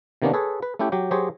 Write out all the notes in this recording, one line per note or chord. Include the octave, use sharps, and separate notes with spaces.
C3 D#3 A#3 B3 C#4 D4
G#4 A4 B4 C#5
B4
A3 C#4 E4 G4 G5
F#3 G4 G5
F#3 G4 G#4 C5 C#5